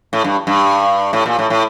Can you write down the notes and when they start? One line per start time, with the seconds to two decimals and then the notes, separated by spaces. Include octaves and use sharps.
0.13 A2
0.24 G2
0.47 G2
1.13 A2
1.26 A#2
1.39 A2
1.50 A2